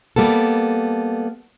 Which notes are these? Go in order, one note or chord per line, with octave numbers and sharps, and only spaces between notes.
G3 A#3 B3 A4